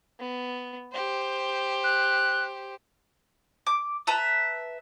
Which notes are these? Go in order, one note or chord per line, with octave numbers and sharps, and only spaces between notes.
B3
G4 C5
F#6
D6
B4 E5 A5 A#5